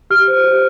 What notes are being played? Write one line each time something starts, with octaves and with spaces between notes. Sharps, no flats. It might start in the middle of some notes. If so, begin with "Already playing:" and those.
G4 F6
C5
G4